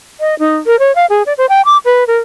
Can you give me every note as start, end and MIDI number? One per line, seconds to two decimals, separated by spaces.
0.20 0.35 75
0.39 0.56 63
0.66 0.79 70
0.79 0.94 73
0.95 1.06 77
1.10 1.23 68
1.26 1.33 74
1.38 1.46 72
1.49 1.61 79
1.65 1.77 86
1.85 2.04 71
2.07 2.18 70